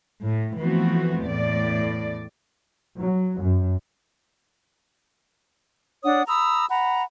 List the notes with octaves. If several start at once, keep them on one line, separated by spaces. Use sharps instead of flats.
A2
E3 F3 A3 B3 C4 F#4
E2 A2 D5
F#3
F#2
D4 C#5 F#5 D#6
A#5 B5 D#6 E6
F#5 A#5 B5